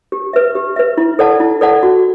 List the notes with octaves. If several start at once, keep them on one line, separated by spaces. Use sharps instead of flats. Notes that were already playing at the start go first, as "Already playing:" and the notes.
G4
B4 E5
G4
B4 E5
E4
A4 D5 F#5 A5
E4
A4 D5 F#5 A5
F#4